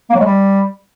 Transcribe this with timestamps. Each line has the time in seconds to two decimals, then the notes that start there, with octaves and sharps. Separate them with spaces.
0.10 A#3
0.15 F#3
0.20 G#3
0.25 G3